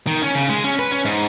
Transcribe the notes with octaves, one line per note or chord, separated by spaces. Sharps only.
D#3
C#4
C#3
G#3
C#4
B4
C#4
G#2